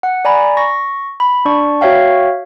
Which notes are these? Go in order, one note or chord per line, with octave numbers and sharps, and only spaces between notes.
F#5
D5 G#5 A#5 B5
C#6 A#6
B5
D4 D5 C#6
F#4 C#5 E5 F5 G5